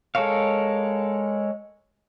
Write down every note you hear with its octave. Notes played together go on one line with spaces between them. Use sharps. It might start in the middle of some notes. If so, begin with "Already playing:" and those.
G#3 A4 A#4 C#5 F5